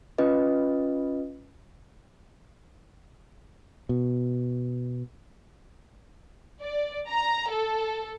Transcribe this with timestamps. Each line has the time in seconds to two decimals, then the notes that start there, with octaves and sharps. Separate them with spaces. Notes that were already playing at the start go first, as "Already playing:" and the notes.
0.18 C#4 F4 B4 D#5
3.89 B2
6.61 D5
7.09 A#5
7.52 A4